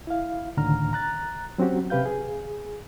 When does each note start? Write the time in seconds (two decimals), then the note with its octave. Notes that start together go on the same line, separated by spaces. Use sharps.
0.07 E4 F5
0.57 C#2 A2 D3 D#3 A#5 F6
0.93 A#5 F#6 A6
1.58 F#3 C4 C#4 F#4 G4
1.90 C3 G4 B4 F5 G6
2.05 G#4